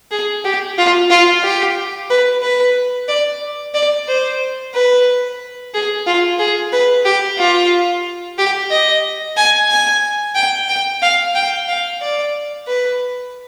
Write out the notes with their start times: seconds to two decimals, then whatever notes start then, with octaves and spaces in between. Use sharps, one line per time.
0.11 G#4
0.45 G4
0.78 F4
1.10 F4
1.43 G4
2.10 B4
2.42 B4
3.08 D5
3.74 D5
4.08 C5
4.74 B4
5.74 G#4
6.06 F4
6.39 G#4
6.72 B4
7.05 G4
7.38 F4
8.38 G4
8.71 D#5
9.37 G#5
9.70 G#5
10.35 G5
10.69 G5
11.02 F5
11.35 G5
11.68 F5
12.01 D5
12.67 B4